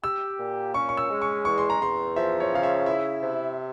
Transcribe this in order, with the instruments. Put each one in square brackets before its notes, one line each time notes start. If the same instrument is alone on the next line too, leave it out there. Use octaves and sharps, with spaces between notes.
[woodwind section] G4 [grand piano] E6
[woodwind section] A#2
[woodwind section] C#4 [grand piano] C#6
[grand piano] C#6
E6
[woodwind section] G#3
[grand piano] C#6
[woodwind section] E2 [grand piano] C#6
[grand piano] C6
A#5
[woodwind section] E2 [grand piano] C6
[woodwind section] F3 [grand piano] E5
[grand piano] C#5
[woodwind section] C#3 [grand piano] F5
[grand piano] E5
[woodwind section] E4 [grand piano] E5
[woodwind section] C3